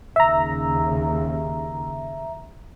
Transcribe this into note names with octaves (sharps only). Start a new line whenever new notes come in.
D#2 C#3 E5 A#5